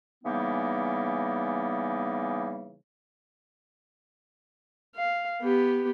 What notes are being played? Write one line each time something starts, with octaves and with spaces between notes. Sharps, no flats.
C#3 E3 G3 A#3 B3 D#4
F5
B3 G4